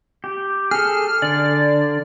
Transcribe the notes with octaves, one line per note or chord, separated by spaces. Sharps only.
G4
G#4 A4 F6
D3 D5